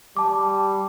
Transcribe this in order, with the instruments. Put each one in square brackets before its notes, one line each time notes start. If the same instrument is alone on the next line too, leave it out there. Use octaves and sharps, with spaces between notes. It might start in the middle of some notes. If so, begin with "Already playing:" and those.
[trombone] G3 [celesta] A5 D6